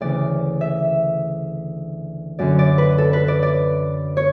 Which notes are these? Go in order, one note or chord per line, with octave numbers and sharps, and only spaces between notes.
D2 C#3 E3 D5
E5
F#2 D3 D5
D5
B4
A4
B4
D5
D5
C#5